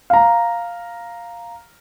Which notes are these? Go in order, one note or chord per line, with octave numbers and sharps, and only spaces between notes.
F5 A#5